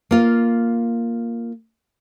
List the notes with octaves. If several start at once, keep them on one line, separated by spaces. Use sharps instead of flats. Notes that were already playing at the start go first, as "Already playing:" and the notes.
A#3 F4